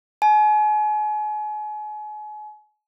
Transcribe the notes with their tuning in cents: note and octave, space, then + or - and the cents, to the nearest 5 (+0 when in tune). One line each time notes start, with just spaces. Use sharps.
G#5 +35